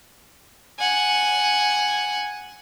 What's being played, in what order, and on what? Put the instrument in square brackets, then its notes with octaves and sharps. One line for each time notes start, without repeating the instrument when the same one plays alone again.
[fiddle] F#5 G#5